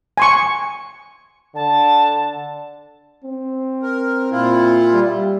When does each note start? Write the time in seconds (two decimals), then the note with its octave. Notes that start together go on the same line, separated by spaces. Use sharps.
0.18 G#5 C6 C#6
1.55 D3 A5
3.24 C4
3.83 A#4
4.32 A#2 E4 F4
4.93 G3